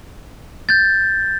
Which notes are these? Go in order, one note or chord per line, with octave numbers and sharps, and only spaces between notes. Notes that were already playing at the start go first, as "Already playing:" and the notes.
G6 A6